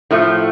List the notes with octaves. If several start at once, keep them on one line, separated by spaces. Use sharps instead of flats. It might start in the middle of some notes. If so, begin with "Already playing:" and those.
A2 F3 A3